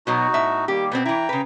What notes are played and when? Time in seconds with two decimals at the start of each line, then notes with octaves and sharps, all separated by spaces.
0.07 B2 F#3 B3 D#4 F#4
0.34 A2 E5
0.68 D#3 G3 A#3 G4
0.92 B2 B3 C4
1.05 E3 E4 G5 A#5
1.29 C#3 B4